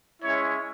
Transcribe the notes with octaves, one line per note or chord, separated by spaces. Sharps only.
G#3 C#4 E4 C#5